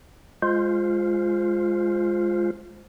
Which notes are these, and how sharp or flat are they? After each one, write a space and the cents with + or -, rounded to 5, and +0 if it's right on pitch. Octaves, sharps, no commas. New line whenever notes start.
G#3 +0 F4 +0 C5 +0